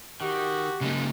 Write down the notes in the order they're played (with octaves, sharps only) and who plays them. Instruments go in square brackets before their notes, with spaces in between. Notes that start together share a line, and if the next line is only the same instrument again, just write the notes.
[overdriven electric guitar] D#3 [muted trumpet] F#4 [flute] G4
[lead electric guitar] C#3 A#3 [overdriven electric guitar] G#3 D#4